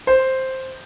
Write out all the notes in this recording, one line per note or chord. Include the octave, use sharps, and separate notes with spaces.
C5